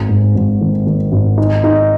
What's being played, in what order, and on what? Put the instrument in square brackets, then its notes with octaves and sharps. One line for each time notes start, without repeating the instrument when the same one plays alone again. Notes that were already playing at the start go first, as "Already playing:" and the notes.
Already playing: [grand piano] G#1
G#2
G#1
D#3
D#3
G#1
D#4
D#4